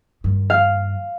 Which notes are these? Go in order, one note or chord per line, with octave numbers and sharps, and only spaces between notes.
G2 D#3
F5